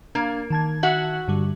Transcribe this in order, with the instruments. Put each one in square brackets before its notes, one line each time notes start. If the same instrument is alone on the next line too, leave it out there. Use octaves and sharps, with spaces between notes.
[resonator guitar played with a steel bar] A#3 [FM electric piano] D4 F5 G#6
[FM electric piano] D#3 A5 G#6
[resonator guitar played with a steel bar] F#4 E5 F#5
[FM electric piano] G2 D3 G3